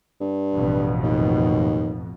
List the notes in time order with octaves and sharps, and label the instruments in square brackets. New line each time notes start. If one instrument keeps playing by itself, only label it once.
[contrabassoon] G2
[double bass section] A1 F2 B2
[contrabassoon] D#2